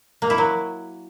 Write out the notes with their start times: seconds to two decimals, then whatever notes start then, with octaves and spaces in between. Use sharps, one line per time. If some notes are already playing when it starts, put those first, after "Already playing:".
0.22 A#3
0.30 E4
0.38 F#3